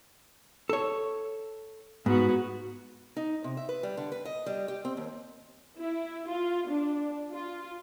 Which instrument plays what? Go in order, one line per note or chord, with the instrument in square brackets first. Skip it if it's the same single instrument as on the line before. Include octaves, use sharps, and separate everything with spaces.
[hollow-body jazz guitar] A4 C#5
[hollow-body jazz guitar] G#2 [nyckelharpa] B3 F#4
[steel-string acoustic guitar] D#4
C3
E5
B4
G3
D3
B4
D#5
G3
G4
C4
D#2
[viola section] E4
F4
D4
F4